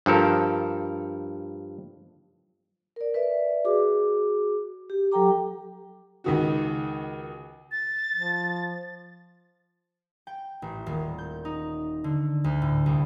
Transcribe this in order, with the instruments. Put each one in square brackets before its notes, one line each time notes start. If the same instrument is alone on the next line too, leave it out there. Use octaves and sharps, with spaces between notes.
[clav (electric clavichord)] G2 F3 A4 A#4
[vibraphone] A#4 D5
B4 D5 E5
F#4 G#4 D6
G4
F#3 G4 A4 G5 A#5 D6
[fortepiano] C#2 D#3 F#4
[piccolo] A6
[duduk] F3
[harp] G5
A1
D#1
G6
D#4
D3
D2
A2
C2